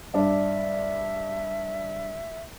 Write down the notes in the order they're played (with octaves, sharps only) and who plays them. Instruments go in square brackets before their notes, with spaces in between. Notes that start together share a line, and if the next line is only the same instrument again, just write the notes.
[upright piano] G2 D4 [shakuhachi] E5